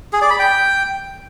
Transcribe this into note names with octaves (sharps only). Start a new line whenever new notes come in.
G#4
D5
B5
G5